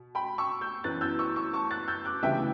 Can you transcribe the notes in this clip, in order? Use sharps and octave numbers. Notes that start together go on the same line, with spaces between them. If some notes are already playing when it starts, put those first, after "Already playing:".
Already playing: B2
G5 B5
C#6 E6
E6 G6
F#2 E3 B3 F#6 A6
E6 G6
C#6 E6
C#6 E6
A5 C#6
F#6 A6
E6 G6
D6 F#6
D2 C#3 E3 G3 B3 E5 G5